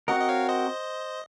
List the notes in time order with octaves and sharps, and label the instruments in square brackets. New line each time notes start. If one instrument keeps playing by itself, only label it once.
[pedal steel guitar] C4 F#4 A#4 [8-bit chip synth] D#5 F#5
[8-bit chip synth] D#5
C#5 F5
C5 D#5